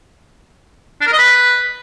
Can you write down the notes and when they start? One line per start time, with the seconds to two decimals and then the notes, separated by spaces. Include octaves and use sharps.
1.01 D4
1.07 A#4
1.12 D#5
1.18 B4